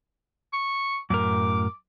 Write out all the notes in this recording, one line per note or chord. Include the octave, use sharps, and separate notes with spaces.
C#6
F#2 A2 A#4 D6